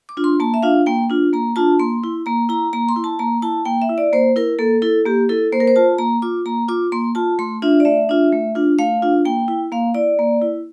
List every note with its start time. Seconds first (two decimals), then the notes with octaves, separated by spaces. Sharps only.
0.09 D6
0.17 D4 F4
0.24 C6
0.40 A#3 A5
0.54 E5
0.63 D4 F4 F5
0.86 A#3 G5
1.10 D4 F4
1.33 A#3 A#5
1.56 D4 F4 A5
1.79 A#3 C6
2.04 E4
2.26 A#3 A#5
2.49 E4 A#5
2.73 A#3 A#5
2.89 C6
2.96 E4
3.04 A5
3.19 A#3 A#5
3.42 E4 A5
3.65 A#3 G5
3.82 E5
3.89 E4
3.98 D5
4.13 A#3 C5
4.36 E4 A#4
4.59 A#3 A4
4.82 E4 A4
5.06 A#3 G4
5.29 E4 A4
5.52 A#3 C5
5.60 A#4
5.67 C5
5.76 F4 A5
5.98 A#3 A#5
6.22 F4 D6
6.46 A#3 A#5
6.68 F4 D6
6.92 A#3 C6
7.15 F4 A5
7.39 A3 C6
7.62 D4 F4 E5
7.80 D5
7.85 A3 E5
8.09 D4 F4
8.32 A3
8.55 D4 F4
8.79 A3 F5
9.03 D4 F4
9.25 A#3 G5
9.48 E4
9.72 A#3 F5
9.94 E4 D5
10.19 A#3
10.42 E4